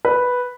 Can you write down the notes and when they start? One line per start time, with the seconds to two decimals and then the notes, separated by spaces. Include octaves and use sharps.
0.05 B4